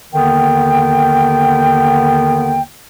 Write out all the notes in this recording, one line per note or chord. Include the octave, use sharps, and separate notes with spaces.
D#2 D3 D#3 B3 G5